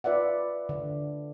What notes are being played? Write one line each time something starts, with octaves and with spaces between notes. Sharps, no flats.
F4 B4 D5 E5 F#5
D3